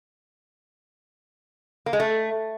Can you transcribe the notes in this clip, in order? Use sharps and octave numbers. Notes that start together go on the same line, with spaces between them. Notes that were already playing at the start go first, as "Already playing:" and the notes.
A#3
G#3
A3